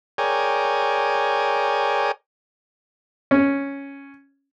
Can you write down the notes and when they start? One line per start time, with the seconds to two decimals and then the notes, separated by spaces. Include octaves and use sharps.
0.18 G#4 A#4 C#5 D5 G5 G#5
3.31 C#4